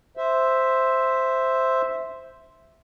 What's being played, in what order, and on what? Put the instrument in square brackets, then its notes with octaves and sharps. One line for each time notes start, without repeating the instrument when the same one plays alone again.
[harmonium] C5 E5